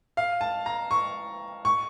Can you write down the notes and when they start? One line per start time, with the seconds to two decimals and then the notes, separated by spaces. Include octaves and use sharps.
0.17 F5
0.41 A5
0.66 A#5
0.91 C#6
1.65 C#6